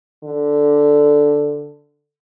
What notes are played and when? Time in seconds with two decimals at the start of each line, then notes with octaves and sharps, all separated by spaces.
0.24 D3